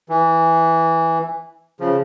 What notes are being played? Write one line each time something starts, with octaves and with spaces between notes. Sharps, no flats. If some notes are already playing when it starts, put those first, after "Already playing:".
E3
C#3 F3